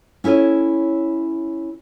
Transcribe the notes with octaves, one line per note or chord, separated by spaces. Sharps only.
C#4 E4 A4 C#5 D#5